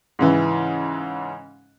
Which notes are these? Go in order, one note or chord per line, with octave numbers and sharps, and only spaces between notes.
G#2 C#3 E3